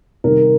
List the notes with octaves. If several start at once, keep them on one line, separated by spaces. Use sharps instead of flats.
C3 D#3 G3 A#4